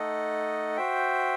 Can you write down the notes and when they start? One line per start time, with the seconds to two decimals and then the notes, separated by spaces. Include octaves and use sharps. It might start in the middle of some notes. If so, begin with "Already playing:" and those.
Already playing: A3 D#4 A4 D#5 F#5
0.77 F#4 C5 E5 G5